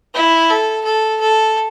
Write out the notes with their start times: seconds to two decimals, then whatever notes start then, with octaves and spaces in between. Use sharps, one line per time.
0.14 E4
0.50 A4
0.85 A4
1.20 A4